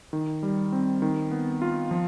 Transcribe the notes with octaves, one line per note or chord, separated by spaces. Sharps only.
D#3
G3
C4
D#3
B3
F4
F3